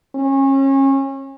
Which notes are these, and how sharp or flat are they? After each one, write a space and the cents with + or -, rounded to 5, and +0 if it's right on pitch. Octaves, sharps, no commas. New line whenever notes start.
C#4 -30